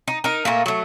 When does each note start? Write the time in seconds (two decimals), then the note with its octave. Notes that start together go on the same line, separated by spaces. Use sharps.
0.08 D#4
0.24 D#4 A#4
0.45 A#2 A3 A#3
0.66 F#3 A3